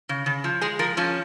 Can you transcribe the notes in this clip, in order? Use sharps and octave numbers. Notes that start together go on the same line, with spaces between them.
C#3
C#3
F3
G#3 G#4
F3 A#4
F3 C#4